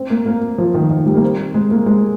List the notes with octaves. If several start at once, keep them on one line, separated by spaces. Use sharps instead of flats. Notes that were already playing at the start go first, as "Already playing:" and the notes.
Already playing: C4
A#3
A#3
F3
D#3
D#3
G3
A#3
C4
G#3
A#3
G#3